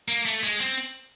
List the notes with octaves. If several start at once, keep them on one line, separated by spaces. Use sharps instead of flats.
A#3
A3
G#3
C4